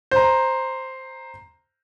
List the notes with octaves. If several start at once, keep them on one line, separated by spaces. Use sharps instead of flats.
C5 A#5